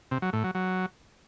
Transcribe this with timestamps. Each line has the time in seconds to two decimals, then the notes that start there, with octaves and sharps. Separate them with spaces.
0.11 C3
0.22 F#3
0.33 A2
0.44 F#3
0.55 F#3